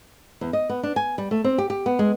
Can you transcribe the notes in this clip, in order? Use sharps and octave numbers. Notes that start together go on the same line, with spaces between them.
E2
D#5
B3
D4
G#5
G3
A3
C4
G4
G4
B3
G#3